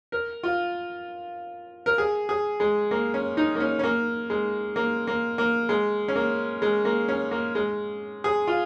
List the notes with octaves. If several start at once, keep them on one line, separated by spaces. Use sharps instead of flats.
A#4
F4
A#4
G#4
G#4
G#3
A#3
C#4
D#4
A#3
C#4
C#4
A#3
G#3
A#3
A#3
A#3
G#3
C#4
A#3
G#3
A#3
C#4
A#3
G#3
G#4
F4